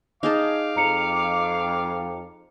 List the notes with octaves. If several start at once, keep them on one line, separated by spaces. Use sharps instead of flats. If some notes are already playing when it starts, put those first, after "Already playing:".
D#4 G#4 F5 A5 D6
F2 A#5 C#7 F7